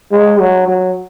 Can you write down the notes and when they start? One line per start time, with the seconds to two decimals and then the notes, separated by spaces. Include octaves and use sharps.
0.12 G#3
0.40 F#3
0.68 F#3